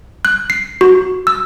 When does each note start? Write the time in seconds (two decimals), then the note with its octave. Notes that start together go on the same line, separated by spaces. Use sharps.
0.25 F#6
0.50 C7
0.81 F#4
1.27 E6